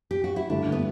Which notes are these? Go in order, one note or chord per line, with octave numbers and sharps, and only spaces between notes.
G4
F#4
E4
G2 D3 A3 D4 E4
B3